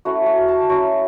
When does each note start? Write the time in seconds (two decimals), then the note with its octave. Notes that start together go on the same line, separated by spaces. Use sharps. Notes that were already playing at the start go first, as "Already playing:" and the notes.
0.05 A3 C#4 E4 F#4
0.26 F#4
0.48 A5
0.69 F#3 C#4 E4 C#6